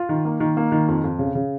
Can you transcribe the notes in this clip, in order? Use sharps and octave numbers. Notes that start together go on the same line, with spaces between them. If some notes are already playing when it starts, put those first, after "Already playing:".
Already playing: F4
D#3
A#3
D#3
A#3
D#3
F2
F2
C#3
C#3